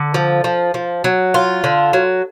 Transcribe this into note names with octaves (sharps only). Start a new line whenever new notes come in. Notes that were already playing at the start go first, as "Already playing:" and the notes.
Already playing: D3
F3
F3
F3
F#3
F4
D3
F#3